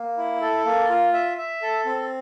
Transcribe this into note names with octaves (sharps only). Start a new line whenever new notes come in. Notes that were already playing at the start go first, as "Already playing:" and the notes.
Already playing: A#3
E4
A4
A#3
F4
E5
E5
A4
C4